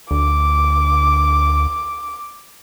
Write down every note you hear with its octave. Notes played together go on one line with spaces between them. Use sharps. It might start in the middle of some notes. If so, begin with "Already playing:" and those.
D2 D6